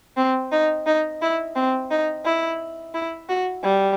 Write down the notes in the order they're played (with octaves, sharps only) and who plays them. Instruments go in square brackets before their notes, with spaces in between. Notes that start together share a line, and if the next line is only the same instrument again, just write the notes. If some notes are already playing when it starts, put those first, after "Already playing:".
[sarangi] C4
D#4
D#4
E4
C4
D#4
E4
E4
F#4
G3